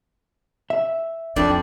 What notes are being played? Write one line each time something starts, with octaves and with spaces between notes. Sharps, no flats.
E5
F2 D4 D5